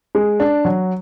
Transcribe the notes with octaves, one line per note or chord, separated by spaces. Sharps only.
G#3
D4
F#3